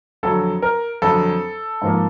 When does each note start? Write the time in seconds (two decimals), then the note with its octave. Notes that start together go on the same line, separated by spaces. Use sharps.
0.23 F2 D3 F#3 A4
0.62 A#4
1.02 F2 D3 F#3 A4
1.81 G#2 F3 A#3